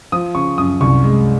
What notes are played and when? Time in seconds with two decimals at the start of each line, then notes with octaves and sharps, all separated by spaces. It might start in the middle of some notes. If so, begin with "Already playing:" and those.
0.12 F3 D#6
0.35 C#3 C#6
0.58 F#2 D#6
0.81 C2 C#6
1.04 G#3